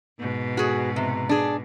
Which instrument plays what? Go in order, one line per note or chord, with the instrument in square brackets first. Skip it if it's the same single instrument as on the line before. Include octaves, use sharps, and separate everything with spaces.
[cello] G#2 B2
[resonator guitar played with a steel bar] F#4 G#4
C3
D4 G#4